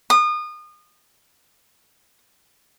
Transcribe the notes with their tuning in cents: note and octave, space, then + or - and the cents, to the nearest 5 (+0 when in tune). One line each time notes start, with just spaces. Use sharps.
D#6 -30